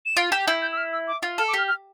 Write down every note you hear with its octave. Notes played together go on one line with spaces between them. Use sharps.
E7
F4 D7
G4 E7
E4 G6
G6
E6
F6
E6
D6
F4
A4 F6
D6
G4 F6
F6